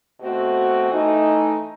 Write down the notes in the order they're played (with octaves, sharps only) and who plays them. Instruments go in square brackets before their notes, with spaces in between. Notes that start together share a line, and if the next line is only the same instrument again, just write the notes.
[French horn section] B2 A3 C4 F#4
E3 A3 D#4